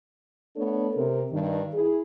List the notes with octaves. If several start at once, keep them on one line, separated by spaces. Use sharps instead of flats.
A3 B3 D4 A4 C#5
C3 A#4
G2 D#3
E4 G#4